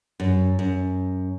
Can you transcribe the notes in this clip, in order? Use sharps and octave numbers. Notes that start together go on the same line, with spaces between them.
F#2
F#2